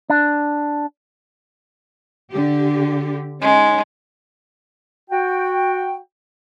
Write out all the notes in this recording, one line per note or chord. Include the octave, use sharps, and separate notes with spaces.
D4
D3 G4
G#3 C#4 D#4
F#4 G5